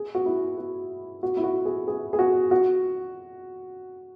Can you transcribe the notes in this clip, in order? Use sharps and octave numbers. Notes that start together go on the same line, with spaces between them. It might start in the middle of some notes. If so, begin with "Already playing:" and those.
Already playing: G#4
F#4
E4
F#4
F#4
E4
F#4
G#4
G#4
G#4
F#4
F#4